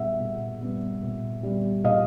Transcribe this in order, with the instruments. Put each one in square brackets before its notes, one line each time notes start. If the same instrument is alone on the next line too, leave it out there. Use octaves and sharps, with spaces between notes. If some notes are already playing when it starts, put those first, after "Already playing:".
Already playing: [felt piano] A#2 G3 B3 E5 F#5
A#2
G3 B3
A#2
G3 B3
A#2 D#5 F5